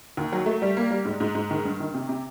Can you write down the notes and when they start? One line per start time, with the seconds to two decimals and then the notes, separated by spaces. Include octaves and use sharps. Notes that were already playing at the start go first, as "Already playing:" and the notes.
0.17 D#2
0.32 F#3
0.46 A3
0.62 G3
0.77 A#3
0.91 G3
1.05 G#2
1.20 G#2
1.35 G#2
1.51 D#3
1.65 G2
1.80 D#3
1.94 C3
2.09 C3